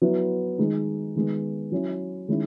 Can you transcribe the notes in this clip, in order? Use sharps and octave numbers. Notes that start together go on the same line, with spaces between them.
F#3 B3 E4
D#3 G#3 D#4
D#3 G#3 B3
F#3 C#4 E4
D#3 G#3 C#4 E4